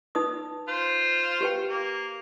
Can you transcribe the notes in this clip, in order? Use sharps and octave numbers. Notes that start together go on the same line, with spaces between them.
D#4 B4 D#6
F4 C5
G4 B4 G5
A#3